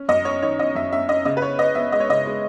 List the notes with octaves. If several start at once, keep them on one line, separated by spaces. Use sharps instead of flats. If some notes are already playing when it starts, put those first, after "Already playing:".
Already playing: C#4
F#2 D#5
C#4 C#5
D#3 C#5
C#4 D#5
F#2 E5
C#4 E5
C#4 D#5
C#3 D#5
B4
B3 C#5
B3 D#5
B3 E5
G#3 D#5
C#5
C#3 D#5
G#3